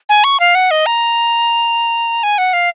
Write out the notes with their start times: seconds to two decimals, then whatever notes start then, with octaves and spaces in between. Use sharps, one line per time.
0.09 G#5
0.24 C#6
0.40 F5
0.55 F#5
0.71 D#5
0.86 A#5
2.23 G#5
2.38 F#5
2.53 F5